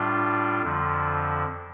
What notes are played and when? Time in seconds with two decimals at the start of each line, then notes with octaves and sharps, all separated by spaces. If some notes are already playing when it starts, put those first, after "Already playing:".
Already playing: A2 G3 D4 F4
0.61 F2 D3 F3